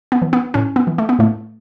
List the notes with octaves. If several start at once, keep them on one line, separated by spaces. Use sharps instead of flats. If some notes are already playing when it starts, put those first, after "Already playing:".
B3
E3
B3
A2 C#4
B3
E3
A3
B3
A2 A3